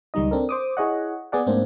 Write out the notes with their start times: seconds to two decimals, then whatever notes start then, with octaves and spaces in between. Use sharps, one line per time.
0.14 C#2 D#3 G3 D#4 D#5
0.31 C4 D4 A4 A#4
0.49 C5 D6 D#6
0.77 E4 G#4 C#5 D#5 F#5
1.32 B3 G#4 D5 F#5
1.47 G#2 A3 A#3 C4 D4